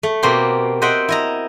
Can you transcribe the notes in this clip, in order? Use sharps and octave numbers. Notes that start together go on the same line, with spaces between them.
A3
B2 A#3 C4 G4 C6
C5 D#5 E5 F#5 G5
E4 D#5 A#5